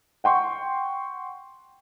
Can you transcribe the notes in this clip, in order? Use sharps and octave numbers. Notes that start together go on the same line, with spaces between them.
F#5 G5 C6 C#6